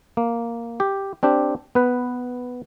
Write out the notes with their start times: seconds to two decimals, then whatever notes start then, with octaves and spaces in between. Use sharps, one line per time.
0.17 A#3
0.80 G4
1.23 C4 D4 G4
1.75 B3 B4